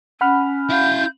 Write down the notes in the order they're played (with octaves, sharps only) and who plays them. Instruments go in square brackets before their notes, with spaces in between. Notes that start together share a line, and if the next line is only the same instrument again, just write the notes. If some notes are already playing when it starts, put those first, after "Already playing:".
[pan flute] C#4 [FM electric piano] F#5 B5 F6
[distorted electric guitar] E4 F5 [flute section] G6